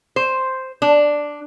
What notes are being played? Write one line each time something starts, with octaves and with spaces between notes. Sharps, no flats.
C5
D4